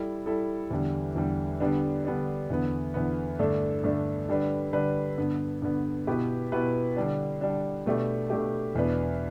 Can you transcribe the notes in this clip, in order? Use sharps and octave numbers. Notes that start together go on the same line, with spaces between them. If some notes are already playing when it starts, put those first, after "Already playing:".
Already playing: G3 E4 A4
G3 E4 A4
E2 D3 G3
E2 D3 G3
D3 G3 B3 D4
D3 G3 B3 D4
E2 D3 B3
E2 D3 B3
G2 D3 A3 D4 A4
G2 D3 A3 D4 A4
D3 G3 D4 B4
D3 G3 D4 B4
G2 D3 B3
G2 D3 B3
B2 B3 E4 G4 B4
B2 B3 E4 G4 B4
D3 G3 D4
D3 G3 D4
B2 A3 D4 G4
B2 A3 D4 G4
E2 B2 B3 D4 B4